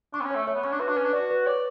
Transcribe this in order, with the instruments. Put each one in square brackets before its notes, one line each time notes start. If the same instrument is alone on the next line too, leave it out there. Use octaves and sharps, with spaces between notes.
[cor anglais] D4 [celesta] C#6
[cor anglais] B3
C#4
[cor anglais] A3 [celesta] C#5
[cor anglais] A3 [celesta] C#5
[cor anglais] B3
[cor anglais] C#4 [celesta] C#6
[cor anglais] D4
[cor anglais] F#4 [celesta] B4
[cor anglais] D4
[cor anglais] C#4 [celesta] B4
[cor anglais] D4
[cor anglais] F#4 [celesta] D5
[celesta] B4
[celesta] C#5 [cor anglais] D5